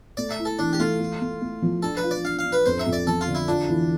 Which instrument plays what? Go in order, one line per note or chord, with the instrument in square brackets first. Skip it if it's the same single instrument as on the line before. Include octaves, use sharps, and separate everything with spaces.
[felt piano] A3 [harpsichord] D5
[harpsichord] E5
[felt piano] E4
[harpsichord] A4
[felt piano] E3 [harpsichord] D4
[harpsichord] G4
[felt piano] A3 [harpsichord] F4
[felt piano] A3
A3
A3
F3
[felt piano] D4 [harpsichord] A4
[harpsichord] B4
[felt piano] F4
[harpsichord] D5
[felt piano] D4 [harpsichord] F5
[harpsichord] F5
[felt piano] D4
[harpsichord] B4
[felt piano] F2 [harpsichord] C5
[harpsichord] E5
[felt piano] F2
[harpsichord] D5
[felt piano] F3 [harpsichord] A4
[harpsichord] F4
[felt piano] D3
[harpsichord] E4
[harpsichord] D4 [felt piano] F4
[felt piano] E3